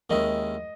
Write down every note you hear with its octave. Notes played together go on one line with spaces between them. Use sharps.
D#2 D#3 G#3 C#4 E4 D#5